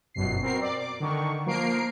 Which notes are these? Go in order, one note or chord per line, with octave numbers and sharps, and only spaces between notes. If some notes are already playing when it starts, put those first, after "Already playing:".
G1 F#2 B2 C7
B2 C4 A#4 C7
D5 D6
D6
D3 D#3 C#6
F3 A#3 A#4 C7 D7